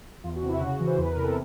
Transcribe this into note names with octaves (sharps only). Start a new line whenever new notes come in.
E2 F4
F#4
C3
E4
C#3 F#4
E3
C5
E2 B4
A#4
C3
A4